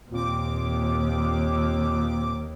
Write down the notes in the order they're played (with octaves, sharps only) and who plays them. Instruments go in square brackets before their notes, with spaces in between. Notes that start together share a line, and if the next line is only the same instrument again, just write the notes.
[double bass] D#2 [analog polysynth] A#2 C4 D6